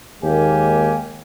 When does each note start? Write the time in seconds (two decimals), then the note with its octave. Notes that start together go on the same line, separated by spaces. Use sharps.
0.23 D#2 D#3 G#3 A#3 G4 G#5